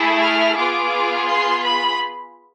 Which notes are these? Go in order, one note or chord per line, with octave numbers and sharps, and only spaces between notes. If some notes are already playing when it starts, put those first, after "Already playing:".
Already playing: A3 E4 G#4
F6
B3 F4 G#4 D6
C6
B5